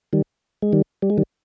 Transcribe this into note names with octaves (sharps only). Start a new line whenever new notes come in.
D#3 G3
G#3
D#3 G3
G3
G#3
D#3 G3